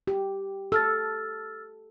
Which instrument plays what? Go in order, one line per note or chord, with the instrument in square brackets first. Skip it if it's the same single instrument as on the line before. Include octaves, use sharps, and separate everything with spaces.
[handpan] G4
[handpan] A4 [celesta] E6 F6 A6